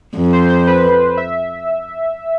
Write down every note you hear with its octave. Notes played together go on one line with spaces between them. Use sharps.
F2
C5
C5
B4
E5